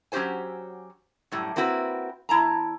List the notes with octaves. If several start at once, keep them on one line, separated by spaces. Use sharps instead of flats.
F#3 C#4 F#4 G4 C5 G#5
F#2 A2 G3
A#3 C4 E4 F#4 B4
E2 E4 A5 A#5